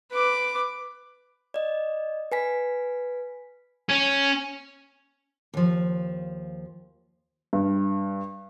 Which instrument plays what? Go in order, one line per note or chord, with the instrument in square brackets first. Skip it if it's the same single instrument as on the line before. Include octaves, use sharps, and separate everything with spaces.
[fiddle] B4 D6
[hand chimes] D5 D#5
B4 G#5 B6
[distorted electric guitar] C#4
[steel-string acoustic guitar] D#2 F3
[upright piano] G2